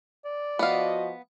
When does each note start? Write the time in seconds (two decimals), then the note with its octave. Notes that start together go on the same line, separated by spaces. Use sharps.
0.25 D5
0.59 F3 B3 F#4 D#5 F5